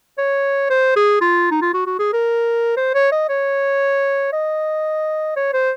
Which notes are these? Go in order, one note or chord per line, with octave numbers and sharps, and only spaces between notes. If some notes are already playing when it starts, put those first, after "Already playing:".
C#5
C5
G#4
F4
D#4
F4
F#4
F#4
G#4
A#4
C5
C#5
D#5
C#5
D#5
C#5
C5